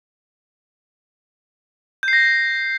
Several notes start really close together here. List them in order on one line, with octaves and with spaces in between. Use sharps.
G6 C7 A#6